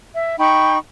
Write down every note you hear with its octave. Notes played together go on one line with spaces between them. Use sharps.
E5
D#4 G5 B5 C#6